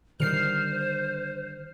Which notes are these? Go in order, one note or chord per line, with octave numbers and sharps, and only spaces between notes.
D3 D#3 G3 C5 F6 C7